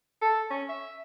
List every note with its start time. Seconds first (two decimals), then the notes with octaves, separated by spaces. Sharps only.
0.22 A4
0.50 C#4
0.69 E5